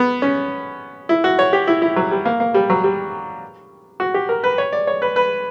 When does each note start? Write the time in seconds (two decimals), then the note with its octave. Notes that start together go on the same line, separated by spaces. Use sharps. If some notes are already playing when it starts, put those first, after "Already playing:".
Already playing: B3
0.22 C#4
1.09 E4
1.24 F#4
1.39 C#5
1.53 G4
1.67 E4
1.82 E4
1.96 F#3
2.11 G3
2.25 A#3
2.40 A#3
2.54 G3
2.70 F#3
2.84 G3
4.00 F#4
4.14 G4
4.29 A#4
4.44 B4
4.58 C#5
4.72 D5
4.87 C#5
5.02 B4
5.16 B4